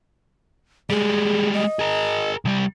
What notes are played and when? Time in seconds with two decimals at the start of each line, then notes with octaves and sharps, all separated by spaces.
0.90 G3 G#3 G#4
1.54 D#5
1.79 G#4 A#4
2.45 C2 G3